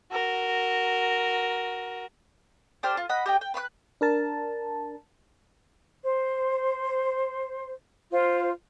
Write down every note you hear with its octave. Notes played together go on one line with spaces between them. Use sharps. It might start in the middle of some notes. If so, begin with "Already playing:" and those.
F#4 A#4
D4 G4 C5 F6
F4
D#5 F#5 B5
G4 D#5 G5
G5
B4 B5 C6 F#6
D4 A#4 A5
C5
F4 C5